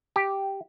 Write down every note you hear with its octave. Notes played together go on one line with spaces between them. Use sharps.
G4